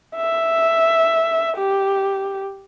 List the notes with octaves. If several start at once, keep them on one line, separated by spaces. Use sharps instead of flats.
E5
G4